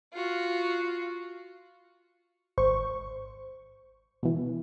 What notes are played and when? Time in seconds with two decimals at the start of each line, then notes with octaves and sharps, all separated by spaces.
0.13 F4 F#4
2.58 G#1 C5 C#6
4.23 B2 E3